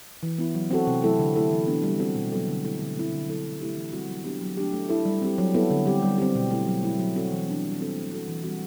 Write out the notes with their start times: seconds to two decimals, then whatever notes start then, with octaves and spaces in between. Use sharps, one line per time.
0.23 E3
0.39 B3 E4
0.55 F#3
0.71 C4 F#4 A4
0.87 C3
1.03 F#3 A3 E4 A4
1.19 D3
1.36 A3 E4 A4
1.51 E3
1.67 B3 D4
1.83 G3
1.99 C4 F#4 A4
2.16 B2
2.32 F#3 B3 F#4 A4
2.48 D3
2.64 A3 E4 A4
2.80 D3
2.96 A3 C4 E4
3.12 D3
3.28 F#3 A3 E4 A4
3.44 F#3
3.61 A3 E4 G4
3.77 E3
3.93 G3 C4 F#4
4.09 F#3
4.25 B3 D4 G4
4.41 F#3
4.57 A3 D4 G4
4.73 A3
4.89 E4 A4
5.05 G3
5.22 C4 G4
5.38 F#3
5.54 B3 E4 A4
5.70 D3
5.86 G3 C4 G4
6.02 G3
6.18 C4 G4
6.35 B2
6.51 A3 E4
6.67 F#3
6.83 A3 E4
6.99 F#3
7.15 C4 F#4 A4
7.31 E3
7.48 B3 D4
7.64 G3
7.80 C4 F#4 A4
7.96 A3
8.11 C4 F#4 A4
8.28 E3
8.44 G3 C4 F#4